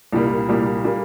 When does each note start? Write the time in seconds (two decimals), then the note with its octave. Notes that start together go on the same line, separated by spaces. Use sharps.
0.13 C2 A#2 G3 A#3
0.49 C2 A#2 G3 A#3
0.84 A#2 G3 A#3